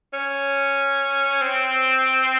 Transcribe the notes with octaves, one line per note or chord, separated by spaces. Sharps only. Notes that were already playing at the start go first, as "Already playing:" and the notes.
C#4
C4